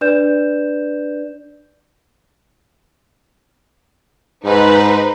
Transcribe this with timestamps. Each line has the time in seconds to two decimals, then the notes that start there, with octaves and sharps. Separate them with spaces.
0.01 D4 B4 D5 G6 E7
4.45 G#2 D#4 B4 C5